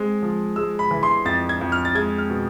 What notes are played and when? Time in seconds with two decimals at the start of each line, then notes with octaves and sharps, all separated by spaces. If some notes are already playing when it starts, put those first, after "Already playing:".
Already playing: G#3 C4
0.22 F3
0.56 G#3 E6
0.79 B5
0.91 E3
1.03 C6
1.25 F2 A6
1.49 G#6
1.61 F2
1.72 F6
1.85 A6
1.95 G#3 G#6
2.18 F6
2.30 B2